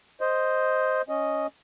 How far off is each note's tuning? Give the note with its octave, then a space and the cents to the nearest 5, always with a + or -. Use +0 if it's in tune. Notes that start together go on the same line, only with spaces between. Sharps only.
C5 +0 D#5 +0
C#4 +0 D#5 +0